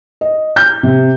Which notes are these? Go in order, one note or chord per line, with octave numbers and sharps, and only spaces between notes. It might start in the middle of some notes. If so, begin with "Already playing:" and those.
D#5
G6
C3